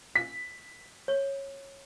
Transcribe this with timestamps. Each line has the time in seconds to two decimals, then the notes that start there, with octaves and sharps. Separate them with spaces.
0.16 B6
1.08 C#5